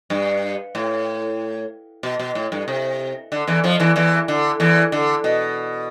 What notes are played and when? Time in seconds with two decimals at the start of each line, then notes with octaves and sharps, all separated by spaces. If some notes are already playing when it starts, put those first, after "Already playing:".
0.10 G2
0.75 A2
2.03 B2
2.19 B2
2.35 A2
2.52 G2
2.68 C3
3.32 D3
3.47 E2 E3
3.64 F2 F3
3.80 E2 E3
3.96 E2 E3
4.28 D3
4.60 E2 E3
4.92 D3
5.24 B2